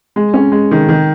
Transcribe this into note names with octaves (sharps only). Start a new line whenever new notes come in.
G#3
C#4
G#3
D#3
D#3